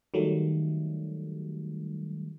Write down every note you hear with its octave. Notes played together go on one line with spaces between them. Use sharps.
D#3 F#3 G3 A3